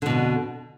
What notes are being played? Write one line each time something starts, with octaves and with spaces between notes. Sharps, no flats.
F2 B2 D3